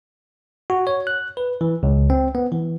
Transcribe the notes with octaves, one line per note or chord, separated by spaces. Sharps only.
F#4
C#5
F#6
B4
E3
C#2
C4
B3
E3